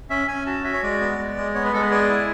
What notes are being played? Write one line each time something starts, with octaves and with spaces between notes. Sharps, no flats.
C#4 E5
C#4 G#5
F#4 A5
F#4 E5
C#5
G#3 D5
B3
G#3
G#3
B3 C#5
B4
G#3 A4
B4
G#4 D5
E4